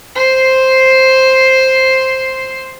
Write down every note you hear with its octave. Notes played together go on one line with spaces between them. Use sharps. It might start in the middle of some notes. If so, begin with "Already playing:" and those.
C5 C6